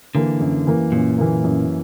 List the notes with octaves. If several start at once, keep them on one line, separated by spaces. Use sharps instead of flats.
D3 E3 A#3
F#2
E3 A#3
F#2 A#2
E3 A#3
F#2